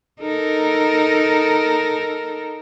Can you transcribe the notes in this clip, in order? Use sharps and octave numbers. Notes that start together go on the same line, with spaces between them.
D#4 A4 A#4